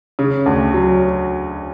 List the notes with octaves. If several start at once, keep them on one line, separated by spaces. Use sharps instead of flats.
C#3
D2
F#3